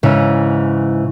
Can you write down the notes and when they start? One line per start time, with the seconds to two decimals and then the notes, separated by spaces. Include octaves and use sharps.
0.03 G#2 C#3 E3